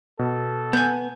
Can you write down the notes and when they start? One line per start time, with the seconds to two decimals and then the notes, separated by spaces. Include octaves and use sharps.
0.19 B2 A4
0.73 B3 G#5 G6